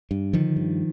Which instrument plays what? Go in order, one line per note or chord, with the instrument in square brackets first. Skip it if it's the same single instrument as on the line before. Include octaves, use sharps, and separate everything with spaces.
[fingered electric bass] G2
D3 D#3 F3
G2